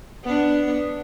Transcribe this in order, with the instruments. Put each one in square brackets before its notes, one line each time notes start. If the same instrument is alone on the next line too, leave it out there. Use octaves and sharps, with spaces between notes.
[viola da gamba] B3 D4